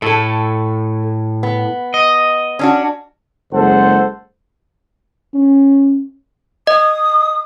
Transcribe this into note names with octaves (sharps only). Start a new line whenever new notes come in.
A2 A3 A4
B3
D#5
C#4 D4 F#4
F#1 G#3 A4 C5 F#5
C#4
D#5 D#6